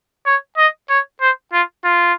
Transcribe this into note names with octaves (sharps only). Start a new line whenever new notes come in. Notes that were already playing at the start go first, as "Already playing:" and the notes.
C#5
D#5
C#5
C5
F4
F4